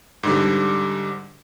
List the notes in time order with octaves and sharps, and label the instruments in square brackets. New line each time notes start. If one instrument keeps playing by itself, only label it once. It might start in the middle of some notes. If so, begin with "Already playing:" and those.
[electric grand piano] G#2 D3 G3